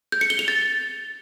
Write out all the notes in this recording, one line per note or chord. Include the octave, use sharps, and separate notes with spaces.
G6
C#7
G7
F7
A6